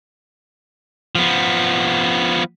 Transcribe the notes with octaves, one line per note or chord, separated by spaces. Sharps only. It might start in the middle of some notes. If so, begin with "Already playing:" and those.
F3 B3